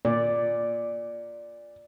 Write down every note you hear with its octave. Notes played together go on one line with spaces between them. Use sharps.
A#2 D5